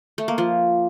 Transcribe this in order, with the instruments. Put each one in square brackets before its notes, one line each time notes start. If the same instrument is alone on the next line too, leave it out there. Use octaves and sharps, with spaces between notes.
[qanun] A3
A#3
F3